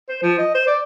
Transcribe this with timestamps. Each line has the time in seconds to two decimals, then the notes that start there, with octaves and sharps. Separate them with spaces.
0.09 C5
0.23 F3
0.38 D#5
0.55 C5
0.67 D5